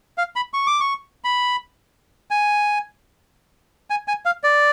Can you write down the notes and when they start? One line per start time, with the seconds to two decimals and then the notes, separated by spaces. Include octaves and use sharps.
0.18 F5
0.36 B5
0.54 C#6
0.67 D6
0.80 C#6
1.24 B5
2.31 G#5
3.90 G#5
4.08 G#5
4.26 F5
4.44 D5